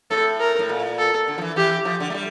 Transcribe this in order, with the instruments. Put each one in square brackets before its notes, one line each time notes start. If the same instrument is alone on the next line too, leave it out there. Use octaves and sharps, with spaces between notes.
[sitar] A2 [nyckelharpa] A4
[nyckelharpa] A#4
[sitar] A2
A#2
[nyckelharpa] A4
[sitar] D3
F3
E3
[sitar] E3 [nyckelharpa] G4
[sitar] F3
D3
A3
G3